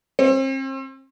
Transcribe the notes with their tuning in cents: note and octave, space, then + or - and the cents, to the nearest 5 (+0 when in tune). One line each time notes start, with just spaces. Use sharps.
C4 +40